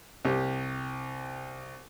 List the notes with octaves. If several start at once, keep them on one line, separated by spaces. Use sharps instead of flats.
C2 G4